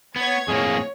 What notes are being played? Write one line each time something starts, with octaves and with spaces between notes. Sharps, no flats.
B3 C#5 G#6
F2 A2 A#3 G#4 C#5